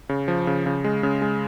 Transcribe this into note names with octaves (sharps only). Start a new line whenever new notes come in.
C#3
F3
C#3
C#3
G#3
C#3
G#3